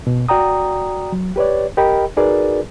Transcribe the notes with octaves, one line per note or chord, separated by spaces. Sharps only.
B2
F#4 D5 G5 A#5 D#6
F#3
G4 B4 C#5 D5
G4 A#4 D#5 G5 B5
D#4 F#4 G#4 A#4 B4 D5